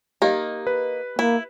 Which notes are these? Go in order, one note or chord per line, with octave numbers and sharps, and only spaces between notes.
A#3 D#4 G4 D#5
B4
A#3 E4